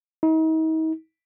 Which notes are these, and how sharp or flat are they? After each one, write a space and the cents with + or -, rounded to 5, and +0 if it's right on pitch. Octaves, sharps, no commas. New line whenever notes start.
D#4 +40